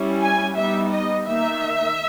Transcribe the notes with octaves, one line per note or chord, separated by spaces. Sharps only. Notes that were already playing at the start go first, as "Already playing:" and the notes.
Already playing: G3 C#4 E4
G#5
G3 B3 D#4 E5
D#5
D#3 A#3 D#4 E5